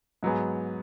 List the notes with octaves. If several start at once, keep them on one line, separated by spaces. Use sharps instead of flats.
G#2 F#3 B3 G#4